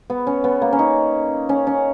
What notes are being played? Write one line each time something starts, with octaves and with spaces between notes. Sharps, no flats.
B3
C#4
B3
A#3
C#4
D#4
C#4
C#4